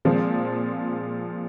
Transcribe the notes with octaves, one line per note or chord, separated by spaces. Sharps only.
A#2 F3 G#3 C4